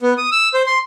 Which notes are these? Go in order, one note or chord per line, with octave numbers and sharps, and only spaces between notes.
B3
D#6
E6
C5
C6